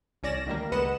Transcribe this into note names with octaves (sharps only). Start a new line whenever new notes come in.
C2 C#4 D5 A#6 E7
D2 D#3 G3 A#3
C#2 B3 B4 D#5 F#5 E7